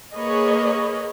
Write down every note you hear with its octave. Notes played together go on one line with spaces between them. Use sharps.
A#3 G#4 B4 C#5 D#5